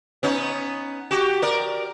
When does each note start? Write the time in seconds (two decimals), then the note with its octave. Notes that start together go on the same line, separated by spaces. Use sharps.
0.23 B3 C#4 D#4
1.11 F#4 G4
1.42 A#4 D5